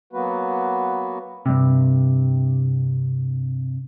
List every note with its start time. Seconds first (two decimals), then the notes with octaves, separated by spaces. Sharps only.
0.13 F#3 A#3 B3 F#4 B4
1.46 G2 C3